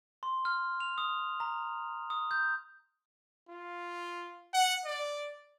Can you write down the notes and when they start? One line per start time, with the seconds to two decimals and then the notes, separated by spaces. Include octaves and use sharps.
0.23 C6
0.45 F6
0.80 F7
0.98 D#6
1.40 A#5
2.10 D#6
2.31 G6
3.49 F4
4.54 F#5
4.85 D5